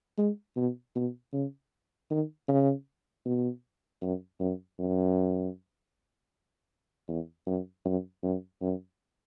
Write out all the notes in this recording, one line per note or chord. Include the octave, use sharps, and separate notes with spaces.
G#3
B2
B2
C#3
D#3
C#3
B2
F#2
F#2
F#2
E2
F#2
F#2
F#2
F#2